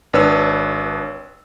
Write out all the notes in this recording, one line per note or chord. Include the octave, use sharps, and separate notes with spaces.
G#1 D4 B4 C#5 E6